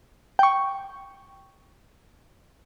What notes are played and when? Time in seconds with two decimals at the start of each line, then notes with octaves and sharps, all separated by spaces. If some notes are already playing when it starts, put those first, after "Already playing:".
0.39 G5 C#6